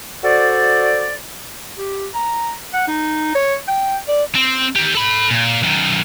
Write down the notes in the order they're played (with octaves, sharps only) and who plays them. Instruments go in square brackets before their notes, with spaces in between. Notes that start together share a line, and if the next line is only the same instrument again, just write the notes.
[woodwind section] F#4 A4 C5 D5
[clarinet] G4
A#5
F#5
D#4
C#5
G5
D5
[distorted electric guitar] C4
D#3 G4
A4 B5
A#2
F#2 D#3